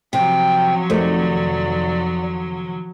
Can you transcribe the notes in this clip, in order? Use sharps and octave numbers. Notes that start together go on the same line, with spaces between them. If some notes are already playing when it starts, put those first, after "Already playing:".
C3 F3 F#3 G5
F2 C3 D#3 A3 D5